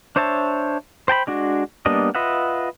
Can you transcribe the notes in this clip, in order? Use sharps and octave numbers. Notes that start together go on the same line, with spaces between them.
D4 C5 C#5 E5 A5
C5 G5 A5 B5
G#3 D4 F#4
G3 A#3 B3 D4 D#5
F4 B4 D#5 E5 F#5